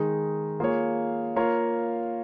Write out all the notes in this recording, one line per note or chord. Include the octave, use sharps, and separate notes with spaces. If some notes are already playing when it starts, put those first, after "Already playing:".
Already playing: D#3 G#3 D#4 G#4
A#3 F4 G#4 C#5
A#3 F4 A#4 C#5